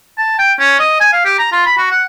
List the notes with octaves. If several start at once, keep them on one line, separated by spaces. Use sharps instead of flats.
A5
G5
C#4
D#5
G#5
F5
G4
A#5
F4
B5
F#4
F#5